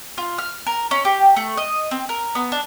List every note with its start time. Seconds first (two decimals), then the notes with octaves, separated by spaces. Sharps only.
0.18 F4
0.38 F6
0.67 A#4
0.91 C#4
1.05 G4
1.36 A3
1.57 D#5
1.91 C4
2.09 A#4
2.35 B3
2.52 D4